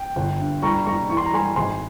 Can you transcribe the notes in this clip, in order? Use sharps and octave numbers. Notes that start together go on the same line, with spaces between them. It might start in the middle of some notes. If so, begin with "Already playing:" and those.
Already playing: G5
G1
G2
G3 A#5 C#6
G3 A#5 C#6
E3 C#6
C6
A#5
G3 G#5 C6
G#1 G#5 C6